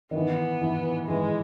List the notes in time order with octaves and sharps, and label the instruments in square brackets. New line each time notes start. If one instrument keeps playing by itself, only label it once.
[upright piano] D#3
[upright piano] E3 [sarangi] B3
[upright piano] E3
[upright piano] E3 [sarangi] G#3